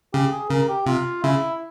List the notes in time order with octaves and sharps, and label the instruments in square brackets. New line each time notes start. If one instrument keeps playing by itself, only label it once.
[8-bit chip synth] C#3 [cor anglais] G4
[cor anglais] G#4
[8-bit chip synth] C#3 [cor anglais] A#4
[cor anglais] G4
[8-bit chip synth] C3 [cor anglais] F4
[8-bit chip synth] C#3 [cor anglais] E4